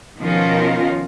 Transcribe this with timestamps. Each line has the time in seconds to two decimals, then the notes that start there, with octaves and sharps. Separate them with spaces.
0.21 B2 D#3 F3 C#4 F4 A#4